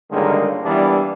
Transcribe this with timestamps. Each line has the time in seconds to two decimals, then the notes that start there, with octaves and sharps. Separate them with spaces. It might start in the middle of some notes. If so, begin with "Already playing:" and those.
0.11 C#2 G2 D3 D#3 G#3 A#3
0.64 E3 G3 A#3 B3 D4 E4